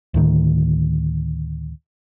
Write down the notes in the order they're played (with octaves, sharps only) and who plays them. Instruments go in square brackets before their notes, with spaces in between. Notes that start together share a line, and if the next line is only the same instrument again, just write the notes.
[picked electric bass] D2 A2 D#3